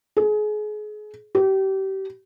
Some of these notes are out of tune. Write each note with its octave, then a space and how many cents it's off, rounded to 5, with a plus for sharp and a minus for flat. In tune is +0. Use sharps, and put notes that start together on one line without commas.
G#4 +30
G4 -30